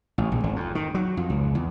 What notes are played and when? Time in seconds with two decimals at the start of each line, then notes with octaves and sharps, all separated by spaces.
0.18 A1
0.32 A#1
0.44 G#1
0.56 F2
0.75 D#3
0.95 F#3
1.17 F2
1.30 C#2
1.55 E2